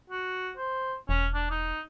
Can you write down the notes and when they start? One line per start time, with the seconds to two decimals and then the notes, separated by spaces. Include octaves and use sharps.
0.10 F#4
0.57 C5
1.09 E1 C#4
1.34 D4
1.51 D#4